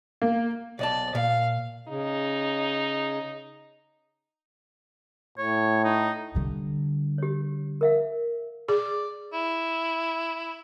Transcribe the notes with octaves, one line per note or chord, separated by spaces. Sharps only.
A#3
B1 D5 D#5 A5
A#2 F5
C#3 D#4
A2 C#5
D#4
D3 G3
G4 C#5
A#4 E5 F5
G#4 D5
E4